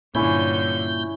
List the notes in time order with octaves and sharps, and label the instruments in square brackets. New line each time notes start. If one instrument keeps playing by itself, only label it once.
[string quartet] G2 D3 [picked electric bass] A#2 [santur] C#4 E4 C#5 [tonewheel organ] G6